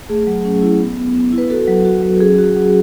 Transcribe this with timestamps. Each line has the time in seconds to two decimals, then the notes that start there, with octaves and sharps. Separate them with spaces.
0.09 A3 G#4
0.27 F#3
0.45 C#4
0.62 E4
0.79 B3
0.97 B3
1.15 B3
1.33 E4
1.38 B4
1.50 F#4 A4
1.67 F#3
1.85 F#4
2.02 F#3
2.20 C#4 G#4
2.38 F#4
2.44 G#4
2.56 F#3